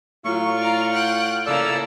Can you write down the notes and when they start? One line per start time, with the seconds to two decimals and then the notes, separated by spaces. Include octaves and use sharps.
0.25 A2 F#3 F4 C#6
0.59 D5 F5 A#5
0.90 F#5 G5 F#6
1.46 C#3 A#3 E4 A4 D5 E6